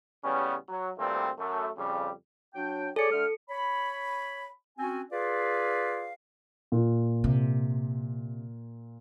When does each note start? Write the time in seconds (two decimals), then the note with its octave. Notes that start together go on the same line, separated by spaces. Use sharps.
0.24 A1 C#3 G3 B3 C#4
0.69 F#3
0.97 D2 G2 A#2 G3 A3 C4
1.38 F#2 A3
1.77 F2 C#3 G3
2.55 F#3 D4 G5
2.96 G#4 A4 C#5 D5 C#7
3.11 D3 A3 F6
3.50 C#5 B5
4.78 C4 C#4 F#4 G#5
5.11 F4 G#4 B4 D5 F5
6.72 A#2
7.24 C3